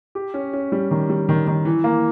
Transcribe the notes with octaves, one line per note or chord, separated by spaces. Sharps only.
G4
C#4
C#4
G3
D#3
G3
D#3
D#3
E3
A#3